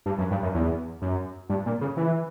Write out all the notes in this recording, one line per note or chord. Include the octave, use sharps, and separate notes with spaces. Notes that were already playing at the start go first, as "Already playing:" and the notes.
G2
F#2
G2
F#2
E2
F#2
G2
A#2
C#3
E3